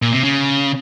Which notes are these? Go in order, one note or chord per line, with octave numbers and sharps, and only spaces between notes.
A#2
C3
C#3